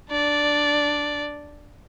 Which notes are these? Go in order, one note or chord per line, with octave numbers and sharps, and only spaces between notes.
D4 D5